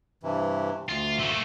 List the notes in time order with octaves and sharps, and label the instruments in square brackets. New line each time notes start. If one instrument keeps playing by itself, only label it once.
[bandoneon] G2 C3 E3
[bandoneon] D2 [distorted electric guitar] F4
[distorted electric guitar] A3 A#3